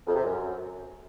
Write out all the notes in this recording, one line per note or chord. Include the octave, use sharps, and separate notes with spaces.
F2
C3
F#2